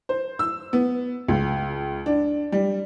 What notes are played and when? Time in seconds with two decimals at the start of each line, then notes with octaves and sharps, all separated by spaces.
0.09 C5
0.39 E6
0.73 B3
1.28 C#2
2.06 D4
2.52 G3